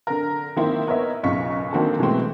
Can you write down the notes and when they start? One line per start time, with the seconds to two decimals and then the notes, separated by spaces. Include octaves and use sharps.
0.07 D3 A#4
0.56 D#3 A#3 C4 E4
0.87 B3 A#4 C#5 D#5 E5
1.23 B1 F#2 C#3 F4 C#6 B6
1.73 D3 D#3 A#3 C4 F#4 A4
1.99 B2 E3 G#3 A3 C4